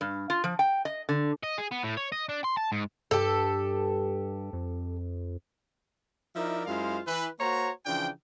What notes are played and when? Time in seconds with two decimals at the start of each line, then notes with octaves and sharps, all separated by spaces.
0.01 G2
0.30 F4
0.44 F3
0.59 G5
0.85 D#5
1.09 D3
1.44 D#5
1.58 G#4
1.72 B3
1.84 A2
1.97 C#5
2.12 D#5
2.29 D4
2.44 C6
2.57 A5
2.72 G#2
3.11 G2 G4 A4
4.53 F2
6.36 F3 D#4 E4 A#4 D5 E5
6.65 F#2 G#3 E4 F4 C5 F5
7.07 E3 B4
7.39 A#3 F#4 C5 C#5 A#5
7.86 C#3 E3 F3 D4 G5